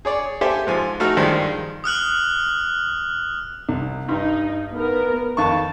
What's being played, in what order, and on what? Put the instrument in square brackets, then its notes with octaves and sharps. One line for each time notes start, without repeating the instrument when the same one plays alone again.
[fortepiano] G#4 C#5 D5
G4 A4 C5 E5 G#5
G#2 F3 G#5
A3 D#4 F#4 F6
G2 D#3 F3 G#3
[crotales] D#6 F6 F#6 F#7
[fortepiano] C2
[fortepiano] G2 [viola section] D#4
[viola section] B3 A#4
[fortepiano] F2 C#6 [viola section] D#3 A5